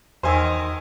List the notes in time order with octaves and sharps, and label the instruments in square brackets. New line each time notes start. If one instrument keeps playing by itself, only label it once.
[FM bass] E2 [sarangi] D#3 [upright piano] C5 G#5 E6